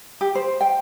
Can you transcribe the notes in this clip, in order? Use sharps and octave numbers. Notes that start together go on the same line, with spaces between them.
G4
C5
G5